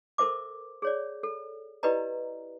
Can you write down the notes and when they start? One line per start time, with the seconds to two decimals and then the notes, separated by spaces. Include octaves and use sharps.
0.18 A4 A#4 C5 E5 D6
0.82 G#4 C#5 D5
1.23 A4
1.83 E4 G4 B4 D5 D#5 A#5